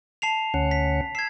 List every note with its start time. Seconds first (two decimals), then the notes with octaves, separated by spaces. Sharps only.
0.22 A5 C7 F7
0.54 D2 C#4 F#5
0.71 B6
1.15 E6 G#6 C7